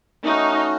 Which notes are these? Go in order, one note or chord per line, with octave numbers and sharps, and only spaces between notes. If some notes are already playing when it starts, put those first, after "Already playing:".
A3 C#4 D#4 F#4